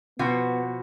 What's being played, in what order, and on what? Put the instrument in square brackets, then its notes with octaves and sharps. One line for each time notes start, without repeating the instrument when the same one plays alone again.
[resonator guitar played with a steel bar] B2 F3 F#4 [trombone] B3